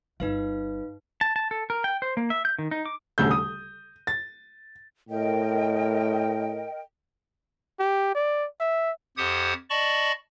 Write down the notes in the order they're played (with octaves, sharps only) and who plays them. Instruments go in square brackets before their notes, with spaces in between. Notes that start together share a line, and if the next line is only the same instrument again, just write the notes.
[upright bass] G1 [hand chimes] D#4 B4 F5
[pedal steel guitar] A5
A5
A4
A#4
G5
C5
A#3
E5
G6
D#3
D#4
D6
[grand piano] D#1 D2 C#3 E6 G6
D#6
A6
[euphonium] A2 [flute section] A#4 D#5 G5
[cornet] G4
D5
E5
[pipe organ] F2 G4 C5 F#5 D#6 G#6
D5 D#5 A5 B5 C#6